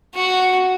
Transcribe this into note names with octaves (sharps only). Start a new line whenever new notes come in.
F#4